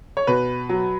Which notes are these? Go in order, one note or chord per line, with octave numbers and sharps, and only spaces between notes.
C#5
B2 B4
F#3